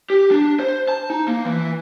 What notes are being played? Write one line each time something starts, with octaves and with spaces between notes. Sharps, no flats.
G4
D4
C5
A5
D#4
A#3
E3